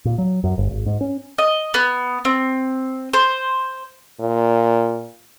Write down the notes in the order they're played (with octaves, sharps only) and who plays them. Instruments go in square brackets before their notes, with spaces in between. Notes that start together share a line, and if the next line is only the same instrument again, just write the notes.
[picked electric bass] A#2
F#3
F#2
G1
G#1
G#2
C#4
[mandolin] D#5
B3
C4
C5
[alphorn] A#2